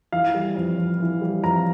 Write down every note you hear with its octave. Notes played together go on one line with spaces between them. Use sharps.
E3 F5
G3
F2
F2
E3
G3
F2 A#5